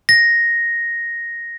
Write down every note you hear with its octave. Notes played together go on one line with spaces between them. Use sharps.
A#6